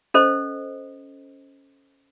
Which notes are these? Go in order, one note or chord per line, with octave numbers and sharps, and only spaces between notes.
C#4 A4 C5 D#5